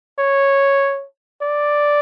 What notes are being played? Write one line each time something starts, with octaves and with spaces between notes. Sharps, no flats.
C#5
D5